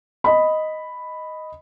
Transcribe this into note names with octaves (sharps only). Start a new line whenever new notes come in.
D#5 B5